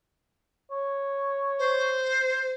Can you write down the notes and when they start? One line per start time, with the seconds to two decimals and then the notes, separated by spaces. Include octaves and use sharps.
0.71 C#5
1.59 C5